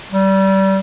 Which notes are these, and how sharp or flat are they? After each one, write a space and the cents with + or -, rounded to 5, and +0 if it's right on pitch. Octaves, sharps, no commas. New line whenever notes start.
G3 -25